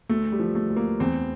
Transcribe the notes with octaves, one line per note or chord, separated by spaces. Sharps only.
D2 A3
G3
F3
A3
D2
A#3
E2 C4